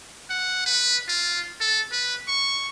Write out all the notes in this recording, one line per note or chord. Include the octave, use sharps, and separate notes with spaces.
F#5
B4
F4
A4
B4
C#6